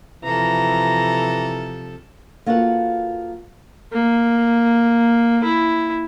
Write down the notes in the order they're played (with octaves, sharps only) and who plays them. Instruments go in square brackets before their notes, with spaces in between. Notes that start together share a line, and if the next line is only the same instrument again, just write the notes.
[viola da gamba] C3 F3 A4 [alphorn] E3 [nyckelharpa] A#5
[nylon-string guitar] A#3 F4 F#4 A4 B4 F#5
[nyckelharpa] A#3
E4